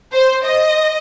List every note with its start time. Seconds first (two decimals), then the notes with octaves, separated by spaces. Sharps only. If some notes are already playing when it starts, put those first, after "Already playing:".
0.12 C5
0.44 D#5